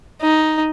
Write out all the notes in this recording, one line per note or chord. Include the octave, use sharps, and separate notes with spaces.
D#4